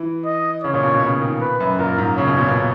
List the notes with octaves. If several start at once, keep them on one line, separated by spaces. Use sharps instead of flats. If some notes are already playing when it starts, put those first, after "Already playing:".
Already playing: E3
D#5
C#3 C#5
A#2
B2
B2
C#3
D#3
B4
F#2
A#2 A#4
G#2
C#3 C#5
B2
A#2
B2